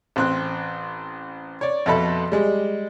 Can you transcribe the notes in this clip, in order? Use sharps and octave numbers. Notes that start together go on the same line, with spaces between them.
A1 C4 F#6
C#5 D5
F2 B2 A4 E5 B5
G3 G#3